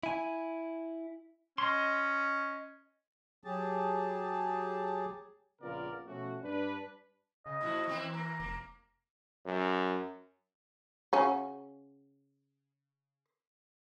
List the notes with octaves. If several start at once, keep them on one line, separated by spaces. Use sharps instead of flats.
E4 G#5
C#4 D#5 C6
F#3 G4 G#4 A5
A#1 C#3 B3 F4 A#4 D5
B2 F3 A3 C#4 F#4
G2 D4 B4
C#3 D#5
A2 F3 E4 F#4
E3 A#3 C4 E4
A#3 A#5
F1 A#3
F#2
C#3 C#4 F#4